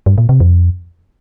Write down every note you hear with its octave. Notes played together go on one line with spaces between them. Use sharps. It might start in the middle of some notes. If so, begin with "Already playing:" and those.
G2
A#2
C3
F2